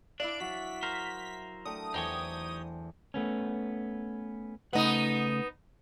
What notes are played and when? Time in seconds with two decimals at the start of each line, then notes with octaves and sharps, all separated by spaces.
0.20 D4 E4 D5 E5 F5
0.40 F#3 F#4 B6
0.83 A#4 C5
1.65 A3 D4 G5 D#6
1.94 E2 D#4 G4 C5 C#5 G5 G#5 A#6
3.14 A3 B3 C#4
4.73 C#3 A3 B3 D#4 F#5